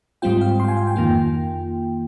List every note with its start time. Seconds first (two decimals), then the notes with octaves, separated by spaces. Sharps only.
0.22 G#2 G3 C4 F4 G5
0.41 F5
0.60 C6
0.64 G5
0.68 G#5
0.77 F5
0.87 G5
0.96 F2 D#3 A#3 F4